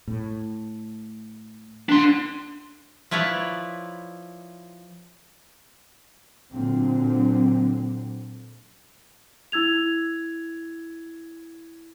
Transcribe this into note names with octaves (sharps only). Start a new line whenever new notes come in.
A2
D4 C6
F3 E4 B4 C#5 D5
A#2 D3 F#3 C4
E4 E6 G#6 F7